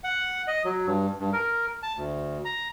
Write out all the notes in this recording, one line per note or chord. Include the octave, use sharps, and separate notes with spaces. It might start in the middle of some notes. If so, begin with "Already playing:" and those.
F#5
D#5
F#3
G2
G2
A#4
A5
D2
A#5